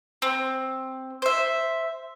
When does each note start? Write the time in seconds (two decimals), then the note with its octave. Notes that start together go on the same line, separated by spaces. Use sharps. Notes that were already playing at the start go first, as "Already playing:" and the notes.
0.22 C4
1.22 C5 E5